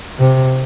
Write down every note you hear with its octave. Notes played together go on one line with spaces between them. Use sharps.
C3